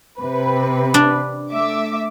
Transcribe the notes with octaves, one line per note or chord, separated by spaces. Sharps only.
C3 B4
D4
A3 E5 D6